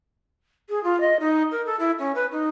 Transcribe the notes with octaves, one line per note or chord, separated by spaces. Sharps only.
G#4
F4
D#5
D#4
A#4
A4
E4
C#4
B4
D#4